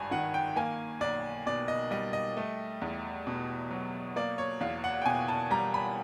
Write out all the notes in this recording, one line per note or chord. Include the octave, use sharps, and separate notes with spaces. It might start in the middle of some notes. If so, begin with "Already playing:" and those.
Already playing: G#1 G2 G3 G#5
D#3 F#5
G5
A#3 G#5
B1 D5
B2 D5
D#5
G3 D#5
D#5
A3
E2
B2
F#3
A#3 D5
C#5
E2 F5
F#5
G5
B2 G#5
A5
G3 A#5
B5